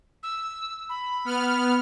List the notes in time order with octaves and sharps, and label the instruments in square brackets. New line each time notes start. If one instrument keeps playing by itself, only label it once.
[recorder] E6
B5
[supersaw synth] B3 F6